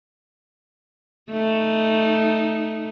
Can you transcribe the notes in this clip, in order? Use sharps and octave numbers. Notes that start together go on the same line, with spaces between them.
A3 D#4